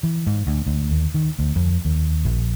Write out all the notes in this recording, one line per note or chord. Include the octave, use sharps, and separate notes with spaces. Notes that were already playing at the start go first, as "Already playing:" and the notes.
E3
G#2
D2
D2
D#2
D#3
D2
F2
D#2
A#1